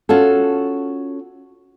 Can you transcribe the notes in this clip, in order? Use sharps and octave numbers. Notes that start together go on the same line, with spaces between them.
C#4 F4 F#4 A4